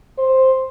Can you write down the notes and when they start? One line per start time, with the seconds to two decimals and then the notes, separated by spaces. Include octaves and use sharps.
0.18 C5